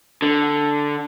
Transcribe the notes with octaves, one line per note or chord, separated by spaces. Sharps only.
D3